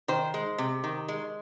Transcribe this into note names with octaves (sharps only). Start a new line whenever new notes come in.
D#3 C5
G#3
C3
D#3
G#3